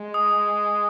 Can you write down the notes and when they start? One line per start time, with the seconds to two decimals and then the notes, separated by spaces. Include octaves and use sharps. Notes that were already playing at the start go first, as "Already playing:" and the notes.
Already playing: G#3
0.14 D#6